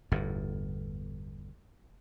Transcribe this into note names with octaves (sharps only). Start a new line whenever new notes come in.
G1 E2 A2